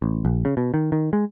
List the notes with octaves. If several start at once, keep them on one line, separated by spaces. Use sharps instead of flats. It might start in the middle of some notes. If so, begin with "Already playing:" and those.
A1
A#1
C#3
B2
D#3
D#3
G#3